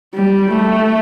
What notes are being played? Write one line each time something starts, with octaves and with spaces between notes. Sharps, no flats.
G3
A3